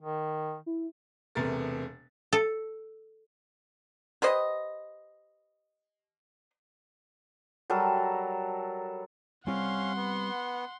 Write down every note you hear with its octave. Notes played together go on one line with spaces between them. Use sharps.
D#3
E4
E1 C3 A3 B3 A#4 A6
A4
G4 B4 C5 D#5
F#3 G3 A4 A#4
G3 C4 C#4 F5 F#5 C6
B3